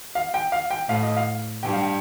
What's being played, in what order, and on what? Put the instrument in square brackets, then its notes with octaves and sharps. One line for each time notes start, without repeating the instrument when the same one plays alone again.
[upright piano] F5
G5
F5
G5
[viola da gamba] A2 [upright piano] F5
[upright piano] D#5
F5
[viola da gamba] G2 [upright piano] G5
[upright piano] F5
G5